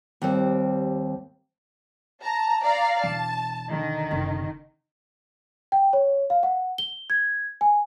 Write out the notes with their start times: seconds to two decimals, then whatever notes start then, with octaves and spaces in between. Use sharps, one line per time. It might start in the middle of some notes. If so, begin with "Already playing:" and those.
0.22 D#2 G3 C4
2.23 A5 A#5
2.63 D5 F5 A#5
3.04 E1 A5
3.69 D3 D#3
4.11 F#1 C3
5.72 G5
5.93 C#5
6.30 F5
6.43 F#5
6.78 G7
7.10 G#6
7.61 G#5